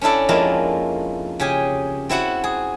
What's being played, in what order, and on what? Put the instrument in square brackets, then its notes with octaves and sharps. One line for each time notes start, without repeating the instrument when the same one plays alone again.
[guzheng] C#4 D4 E4 A4 D5
F2 G#3 A#3 E4 F4
C#3 G4 G#4 G#5
C4 E4 F#4 F#5
G#4